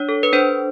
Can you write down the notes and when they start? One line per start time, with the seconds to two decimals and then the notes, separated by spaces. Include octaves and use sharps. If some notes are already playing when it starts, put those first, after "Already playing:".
Already playing: D4 C#5
0.09 A4
0.23 B4
0.33 D4 C5